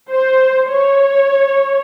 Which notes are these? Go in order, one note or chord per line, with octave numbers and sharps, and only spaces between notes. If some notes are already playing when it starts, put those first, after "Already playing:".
C5
C#5